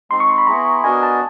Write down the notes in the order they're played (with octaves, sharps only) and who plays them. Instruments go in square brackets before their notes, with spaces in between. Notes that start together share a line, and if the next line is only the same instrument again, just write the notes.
[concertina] G#3 C4 D#4 [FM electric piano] C6
[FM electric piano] C#6
C6
B5
[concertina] B3 E4 G#4 [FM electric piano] A#5
[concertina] B3 D4 F#4 A#4 D#5 [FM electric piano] G#5
[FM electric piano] A5